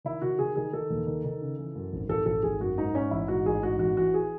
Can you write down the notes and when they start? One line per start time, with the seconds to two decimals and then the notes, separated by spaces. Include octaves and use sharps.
0.05 D#3 E4
0.22 D#3 F#4
0.39 D#3 G#4
0.56 D#3 G#4
0.73 D#3 A4
0.90 D#2
1.07 D#3
1.24 D#3
1.42 C#3
1.59 E3
1.75 F#2
1.93 G#1
2.09 G#1 A4
2.26 G#1 A4
2.43 G#1 G#4
2.60 F#2 F#4
2.77 G#2 D#4
2.94 G#2 C#4
3.11 A1 E4
3.28 G#2 F#4
3.45 A1 G#4
3.62 G#2 F#4
3.79 A1 F#4
3.97 E3 F#4
4.14 G#4